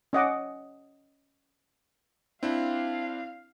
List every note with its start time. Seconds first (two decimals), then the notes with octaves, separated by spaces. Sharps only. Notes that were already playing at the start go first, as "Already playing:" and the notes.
0.13 C#4 D#5 F#5 D6
2.43 C4 D4 E4 F5